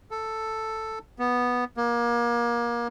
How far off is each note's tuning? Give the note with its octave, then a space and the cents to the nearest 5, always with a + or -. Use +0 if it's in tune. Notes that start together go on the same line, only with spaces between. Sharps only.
A4 +5
B3 -5
A#3 +30